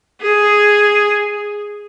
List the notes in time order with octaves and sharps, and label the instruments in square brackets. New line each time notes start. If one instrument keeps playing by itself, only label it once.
[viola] G#4